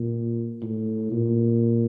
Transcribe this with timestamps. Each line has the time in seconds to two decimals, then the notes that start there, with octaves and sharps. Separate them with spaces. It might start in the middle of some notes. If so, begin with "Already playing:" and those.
Already playing: A#2
0.62 A2
1.12 A#2